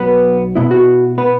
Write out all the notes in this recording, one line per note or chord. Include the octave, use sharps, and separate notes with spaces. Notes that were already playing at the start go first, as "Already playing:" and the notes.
Already playing: B1 B2 F#3 B3 B4
B2 B3 E4
F#4
B3 B4